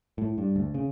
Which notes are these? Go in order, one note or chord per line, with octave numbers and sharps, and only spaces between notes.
A2
G2
D2
C#3